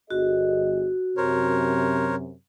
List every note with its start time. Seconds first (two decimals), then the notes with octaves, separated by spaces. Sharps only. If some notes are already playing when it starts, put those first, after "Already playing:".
0.10 G1 F#4 G#4 D#5
1.17 F#2 C3 A#4 C5 C#5